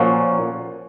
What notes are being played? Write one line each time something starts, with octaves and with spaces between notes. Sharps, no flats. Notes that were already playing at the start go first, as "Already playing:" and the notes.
Already playing: A#2 F3 A#3 C#4 F#4